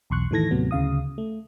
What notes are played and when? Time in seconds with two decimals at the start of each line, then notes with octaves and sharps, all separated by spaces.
0.10 B1 E2 C6 C#6 F#6
0.31 A2 D#3 E3 A4 G#6 A#6
0.51 D#2 A2 C3 F#3 B3
0.71 D2 C#3 F5 D#6
1.18 A3